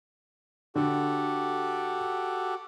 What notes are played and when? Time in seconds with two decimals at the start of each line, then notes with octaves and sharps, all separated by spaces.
0.75 D3 F#4 G4 A4